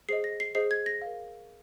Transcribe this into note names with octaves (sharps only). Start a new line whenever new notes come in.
G#4 C5 D#5 C7
A#6
C7
G#4 C5 D#5 C7
G#6
A#6
A#4 F5